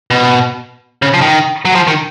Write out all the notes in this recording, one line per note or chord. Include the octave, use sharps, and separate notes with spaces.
B2
C#3
F3
D#3
F#3
F3
D#3